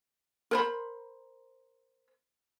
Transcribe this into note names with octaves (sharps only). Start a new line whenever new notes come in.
A#4 C5 B5